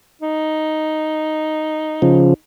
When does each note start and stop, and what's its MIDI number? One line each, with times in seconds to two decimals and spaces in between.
0.22 2.35 63
2.02 2.34 49
2.02 2.34 53